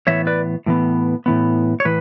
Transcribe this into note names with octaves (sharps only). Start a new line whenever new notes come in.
A2 E3 B3 C#5 E5
B4 D5
A2 E3 B3
A2 E3 B3
C#5
A2 E3 B4